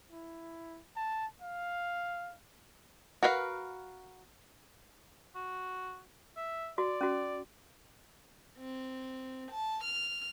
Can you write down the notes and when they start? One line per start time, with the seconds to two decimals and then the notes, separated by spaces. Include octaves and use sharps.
0.10 E4
0.96 A5
1.42 F5
3.23 F#4 A#4 B4 E5 F5
5.36 F#4
6.37 E5
6.78 F#4 D5
7.01 C#4 F#4
8.58 C4
9.51 A5
9.84 F6